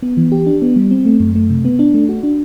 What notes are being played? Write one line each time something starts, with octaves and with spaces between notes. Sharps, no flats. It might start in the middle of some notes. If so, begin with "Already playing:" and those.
B3
E3
G4
D4
B3
G3
C4
A3
F#2
A3
C3
B3
D4
A3
F#4
D4